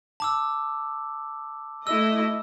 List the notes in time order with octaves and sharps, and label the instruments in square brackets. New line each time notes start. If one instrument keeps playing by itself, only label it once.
[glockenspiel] A5 D6 E6
[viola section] A3 E4 D#5 [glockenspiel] E6